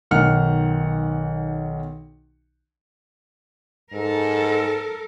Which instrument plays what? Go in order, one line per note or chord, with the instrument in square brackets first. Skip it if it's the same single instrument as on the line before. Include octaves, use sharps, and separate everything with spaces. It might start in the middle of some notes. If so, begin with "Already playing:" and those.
[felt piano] B1 D#3 F#5 F6 C#7
[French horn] G#2 [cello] A4 A#4